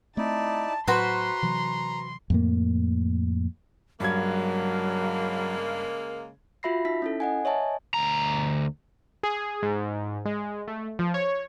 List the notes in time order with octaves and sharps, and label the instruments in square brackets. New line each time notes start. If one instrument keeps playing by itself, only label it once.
[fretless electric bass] A3 C4 [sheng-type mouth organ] D#4 E4 D5 [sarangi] A5
[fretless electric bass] A2 F#3 [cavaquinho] F#4 B4 C5 [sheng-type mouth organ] A#5 [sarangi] C6
[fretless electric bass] C3 E3 F#3
[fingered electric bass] F2 A2 A#3
[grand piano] G2 G#6 [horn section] C#3 G#3 A#3 [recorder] F#3
[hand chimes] F4 F#4 E5 B5 A#6 C7
D#4 E5 B6
C#4 E4 A4
D#5 F#5 G#5
C#5 D#5 E5 G#5 A5
[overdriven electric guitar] D2 A#5
[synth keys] G#4
G#2
G#3
A3
F3
C#5